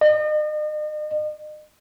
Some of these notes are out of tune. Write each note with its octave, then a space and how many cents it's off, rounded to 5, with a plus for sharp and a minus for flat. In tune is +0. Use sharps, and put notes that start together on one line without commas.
D#5 -40